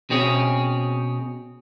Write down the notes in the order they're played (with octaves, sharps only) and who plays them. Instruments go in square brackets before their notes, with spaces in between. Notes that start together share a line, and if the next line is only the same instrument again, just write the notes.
[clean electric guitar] B2 C4 C#4 G#4